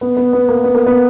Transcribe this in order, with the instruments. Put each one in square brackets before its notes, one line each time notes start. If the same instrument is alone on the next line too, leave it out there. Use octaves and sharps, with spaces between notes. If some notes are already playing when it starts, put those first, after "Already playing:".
[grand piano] B3
B3
B3
A#3
B3
A#3
B3